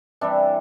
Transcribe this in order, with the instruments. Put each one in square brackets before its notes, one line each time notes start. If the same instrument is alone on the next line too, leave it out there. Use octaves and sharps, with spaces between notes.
[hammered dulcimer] C3 E3 G3 D4